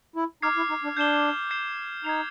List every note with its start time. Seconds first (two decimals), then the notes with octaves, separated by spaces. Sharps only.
0.16 E4
0.42 D#4 D6 F6 G#6 C7
0.57 E4
0.69 D#4
0.84 D4
0.97 D4 G6 C7 E7 G7
1.51 G6 C7 E7 G7
2.04 D#4 G#6 C7 F7